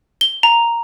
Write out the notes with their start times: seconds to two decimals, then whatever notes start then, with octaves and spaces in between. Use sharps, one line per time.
0.21 G7
0.43 A#5